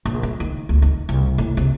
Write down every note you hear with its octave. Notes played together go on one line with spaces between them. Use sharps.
A#1
A3
D#3
D2
D#3
C2
A2
C3